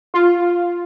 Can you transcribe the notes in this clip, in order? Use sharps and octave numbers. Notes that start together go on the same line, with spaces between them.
F4